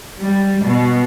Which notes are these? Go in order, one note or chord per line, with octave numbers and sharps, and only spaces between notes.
G3
B2